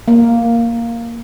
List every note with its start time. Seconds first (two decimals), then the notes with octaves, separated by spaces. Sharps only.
0.08 A#3